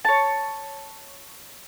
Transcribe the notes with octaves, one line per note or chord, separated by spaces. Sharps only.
C#5 A5